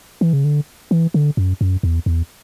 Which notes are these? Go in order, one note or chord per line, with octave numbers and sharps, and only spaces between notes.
E3
C#3
D3
E3
D3
F#2
F#2
E2
E2